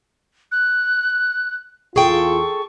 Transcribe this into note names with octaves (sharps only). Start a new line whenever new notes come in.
F#6
E2 F4 G#4 A4 G5 C#6